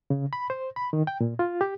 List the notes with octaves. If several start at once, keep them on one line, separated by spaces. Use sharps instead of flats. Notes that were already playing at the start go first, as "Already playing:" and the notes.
C#3
B5
C5
B5
D#3
G5
A#2
F4
G4